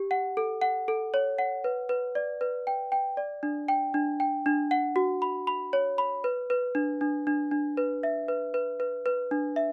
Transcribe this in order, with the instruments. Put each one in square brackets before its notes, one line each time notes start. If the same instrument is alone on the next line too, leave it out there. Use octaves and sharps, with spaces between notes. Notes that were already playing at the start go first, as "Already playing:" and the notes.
Already playing: [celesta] G4
F#5
A4
F#5
A4
C#5
F#5
B4
B4
D5
B4
G5
G5
D5
D4
G5
D4
G5
D4
F#5
F#4
B5
B5
C#5
B5
B4
B4
D4
D4
D4
D4
B4
E5
B4
B4
B4
B4
D4
E5